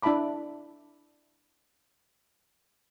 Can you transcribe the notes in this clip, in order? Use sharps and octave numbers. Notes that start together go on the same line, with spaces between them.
D4 E4 E5 A5 B5 D6